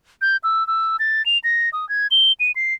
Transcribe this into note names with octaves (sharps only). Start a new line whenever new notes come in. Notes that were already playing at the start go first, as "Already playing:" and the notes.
G6
E6
E6
A6
F7
A#6
D#6
G#6
G7
D#7
C7